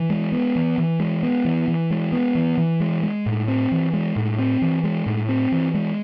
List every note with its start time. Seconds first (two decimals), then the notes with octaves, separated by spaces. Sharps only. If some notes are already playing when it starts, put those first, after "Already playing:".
Already playing: E3
0.10 G#3
0.32 B3
0.56 E3
0.78 E3
1.00 G#3
1.23 B3
1.45 E3
1.68 E3
1.91 G#3
2.12 B3
2.35 E3
2.58 E3
2.80 G#3
3.03 G#3
3.26 A2
3.48 C4
3.72 E3
3.93 G#3
4.16 A2
4.39 C4
4.62 E3
4.84 G#3
5.06 A2
5.29 C4
5.52 E3
5.74 G#3